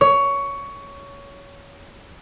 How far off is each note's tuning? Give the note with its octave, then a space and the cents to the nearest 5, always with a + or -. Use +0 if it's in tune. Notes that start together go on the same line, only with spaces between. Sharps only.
C#5 +15